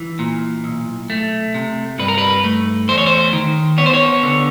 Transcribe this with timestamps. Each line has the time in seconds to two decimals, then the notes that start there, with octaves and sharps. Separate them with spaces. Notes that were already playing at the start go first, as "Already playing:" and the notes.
Already playing: E3
0.19 A#2
0.64 B1
1.10 A3
1.55 C3
1.99 G2 B4
2.08 A#4
2.18 B4
2.44 A3
2.88 E2 C5
2.98 C#5
3.06 C5
3.33 D#3
3.78 B3 C#5
3.86 C5
3.94 C#5
4.23 D3